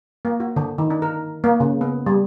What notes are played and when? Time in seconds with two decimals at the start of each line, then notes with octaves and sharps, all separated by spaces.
0.25 A#3
0.40 F#4
0.56 D3
0.78 D#3
0.90 D4
1.02 A#4
1.44 A#3
1.60 C#3
1.81 B3
2.06 G3